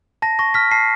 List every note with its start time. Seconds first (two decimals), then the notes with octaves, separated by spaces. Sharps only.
0.22 A5 A#6
0.39 C#6 A#6
0.54 F6 B6
0.71 A5 C7